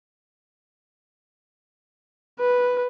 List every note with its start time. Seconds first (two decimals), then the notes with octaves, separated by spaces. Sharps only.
2.40 B4